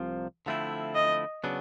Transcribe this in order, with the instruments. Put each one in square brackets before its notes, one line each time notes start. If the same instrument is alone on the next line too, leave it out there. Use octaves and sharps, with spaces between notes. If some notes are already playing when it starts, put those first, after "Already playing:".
Already playing: [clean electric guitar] C2 C3 F3
D3 F3 A3 C4 E4
[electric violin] D#5
[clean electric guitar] C#3 F#3 B3 D4